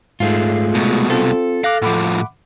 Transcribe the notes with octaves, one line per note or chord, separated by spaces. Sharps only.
G#2 G#3 A3 F4
C2 B2
C4 F4 A4
F5 D6 F#6 A#6
A2 F3 F#5 B5 D6